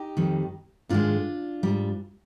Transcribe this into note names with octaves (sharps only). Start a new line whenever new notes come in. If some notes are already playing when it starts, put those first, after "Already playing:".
Already playing: D#4 G4
F2 D#3 G3
G#2 D#3 G#3 D4 F4
G#2 G3